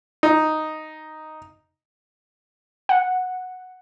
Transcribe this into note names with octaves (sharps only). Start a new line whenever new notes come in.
D#4
F#5